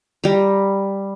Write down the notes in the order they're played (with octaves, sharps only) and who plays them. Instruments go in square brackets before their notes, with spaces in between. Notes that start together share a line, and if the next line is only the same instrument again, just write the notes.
[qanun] G3 A#5